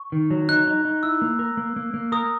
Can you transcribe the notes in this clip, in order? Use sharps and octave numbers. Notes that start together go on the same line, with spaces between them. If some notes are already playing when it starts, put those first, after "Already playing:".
Already playing: C#6
D#3
F#3
D#4 F#6
D#4
D#4
E4 E6
A#3
A#4
A#3
A#3
A#3
A#4 D#6